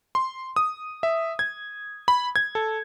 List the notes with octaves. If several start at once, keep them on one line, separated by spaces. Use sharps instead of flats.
C6
D#6
E5
G#6
B5
G#6
A4